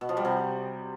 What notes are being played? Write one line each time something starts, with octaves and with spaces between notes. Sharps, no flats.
B2
F3
G3
C3